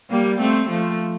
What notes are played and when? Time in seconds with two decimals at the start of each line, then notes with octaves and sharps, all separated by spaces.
0.10 G3 A#3
0.40 A3 C4
0.69 F3 A3